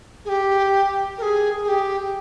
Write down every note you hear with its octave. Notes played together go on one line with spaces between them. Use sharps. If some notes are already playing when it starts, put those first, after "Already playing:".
G#4
G4
A#4
G#4
G#4
G4